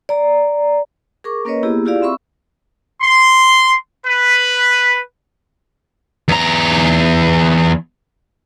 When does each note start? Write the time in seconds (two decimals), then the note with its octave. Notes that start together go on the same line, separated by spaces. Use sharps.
0.09 D5 A#5
1.24 G#4 A#4 C#6 D6
1.45 A#3 C#4 A#4 B4 C#5 D#5
1.63 A#3 B3 E4 G4 G#4
1.85 E4 F4 G4 G#4 D5 F5
2.02 C4 E5 B5 C#6 E6
3.02 C6
4.05 B4
6.28 E2 A#5